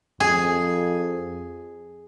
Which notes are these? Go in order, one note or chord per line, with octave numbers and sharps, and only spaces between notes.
F2 G#4